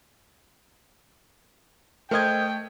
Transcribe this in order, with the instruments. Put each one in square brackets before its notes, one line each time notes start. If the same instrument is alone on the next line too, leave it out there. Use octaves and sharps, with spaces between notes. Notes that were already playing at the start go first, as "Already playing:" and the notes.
[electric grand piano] A3 G#6 [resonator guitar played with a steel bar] A#4 C5 D#5 [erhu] G5